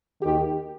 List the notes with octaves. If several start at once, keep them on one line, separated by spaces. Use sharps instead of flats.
D#2 D#3 G4